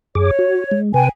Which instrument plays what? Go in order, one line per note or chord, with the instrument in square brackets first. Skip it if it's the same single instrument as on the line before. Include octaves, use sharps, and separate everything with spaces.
[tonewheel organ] F#2 G#4 D6 [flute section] C#5
[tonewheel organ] F#4
G#3
[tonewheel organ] C3 B4 [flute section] G5 G#5